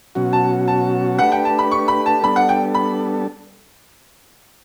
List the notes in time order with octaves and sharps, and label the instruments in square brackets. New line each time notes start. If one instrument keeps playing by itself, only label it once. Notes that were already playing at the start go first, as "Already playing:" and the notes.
[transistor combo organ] B2 F#3 C#4 F#4
[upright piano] A5
A5
[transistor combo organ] A3 D4 G4 B4 [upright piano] F#5
[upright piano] G5
A5
B5
C#6
B5
A5
[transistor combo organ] G3 B3 D4 A4 [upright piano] B5
[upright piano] F#5
G5
B5